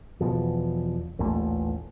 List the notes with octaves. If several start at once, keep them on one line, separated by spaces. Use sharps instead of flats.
E2 B2 F3
A1 D#2 A#2 A3